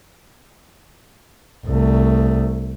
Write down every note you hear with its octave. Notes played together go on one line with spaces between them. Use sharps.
C2 A3